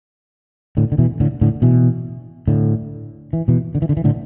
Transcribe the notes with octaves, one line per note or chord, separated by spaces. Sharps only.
A2 D3
D3
B2 E3
A2 D3
A2 D3
B2 E3
A2 D3
E3
B2 E3
D3
E3
D3
E3
A2 D3